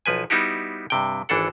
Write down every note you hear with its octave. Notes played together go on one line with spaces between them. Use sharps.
B1 F3 B4 G#5
G3 B3 D#4 E4 F#4 G4
G2 C3 G5
G#1 E3 D4 A4 F#5